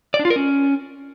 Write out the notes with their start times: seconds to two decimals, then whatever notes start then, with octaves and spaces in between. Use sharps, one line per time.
0.14 D5
0.19 D4
0.25 F4
0.30 A#4
0.36 C#4